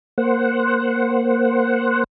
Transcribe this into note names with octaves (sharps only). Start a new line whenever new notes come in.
A#3 C5 F#5